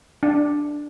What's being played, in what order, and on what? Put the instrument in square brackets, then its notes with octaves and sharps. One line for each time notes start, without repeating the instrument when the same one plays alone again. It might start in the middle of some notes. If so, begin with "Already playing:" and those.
[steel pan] D4